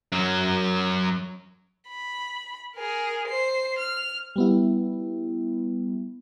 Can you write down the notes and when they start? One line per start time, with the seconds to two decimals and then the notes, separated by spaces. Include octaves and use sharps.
0.12 F#2 F#3
1.88 B5
2.76 G#4 A#4
3.28 C5 C7
3.78 F6
4.36 G3 B3 E4